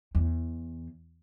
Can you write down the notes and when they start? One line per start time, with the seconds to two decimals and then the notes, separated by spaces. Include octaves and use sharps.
0.15 E2